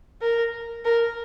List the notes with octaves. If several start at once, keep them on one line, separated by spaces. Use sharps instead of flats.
A#4
A#4